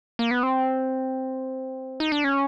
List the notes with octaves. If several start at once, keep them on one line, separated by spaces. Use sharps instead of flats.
A#3
B3
C4
D#4
D4
C#4